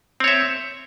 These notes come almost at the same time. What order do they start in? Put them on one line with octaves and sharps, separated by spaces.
C4 C#5 E5